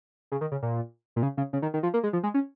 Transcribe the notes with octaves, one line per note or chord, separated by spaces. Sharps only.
C#3
D#3
C#3
A#2
A#2
C#3
C#3
C#3
D#3
D#3
F3
A#3
G#3
F3
G#3
C#4